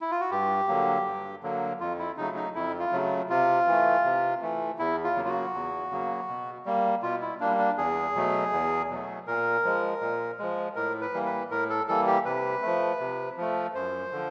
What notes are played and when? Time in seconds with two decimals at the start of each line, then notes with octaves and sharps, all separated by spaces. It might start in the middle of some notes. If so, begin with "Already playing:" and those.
0.01 E4
0.11 F4
0.21 F#4
0.31 G2 G4
0.68 D3 F#3 A#3
1.06 G2
1.43 D3 F#3 A#3
1.80 F2 F4
1.99 E4
2.17 C#3 F#3 A3 D#4
2.36 D#4
2.55 F2 E4
2.80 F4
2.92 C#3 F#3 A3
3.30 C3 F4
3.67 E3 A3
4.04 C3
4.42 E3 A3
4.79 E2 E4
5.04 F4
5.16 C#3 F#3 A#3
5.25 F4
5.29 F#4
5.54 E2
5.91 C#3 F#3 A#3
6.28 B2
6.65 G3 A#3
7.03 B2 F4
7.21 E4
7.40 G3 A#3 D4
7.59 D4
7.78 E2 G#4
8.15 B2 F#3 A3
8.52 E2
8.90 B2 F#3 A3
9.27 A#2 A#4
9.64 F3 G#3
10.01 A#2
10.39 F3 G#3
10.76 A2 A#4
11.01 B4
11.13 E3 G3 A#3
11.26 B4
11.51 A2 A#4
11.70 A4
11.88 E3 G3 A#3 A4
12.07 G4
12.25 C3 B4
12.62 F3 A3
13.00 C3
13.37 F3 A3
13.75 F#2 C5
14.12 D3 F3